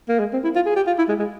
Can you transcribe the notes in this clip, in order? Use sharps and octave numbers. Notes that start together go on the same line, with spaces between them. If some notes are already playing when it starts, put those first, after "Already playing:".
A#3
G#3
C4
E4
F4
G#4
G4
F4
E4
G#3
G#3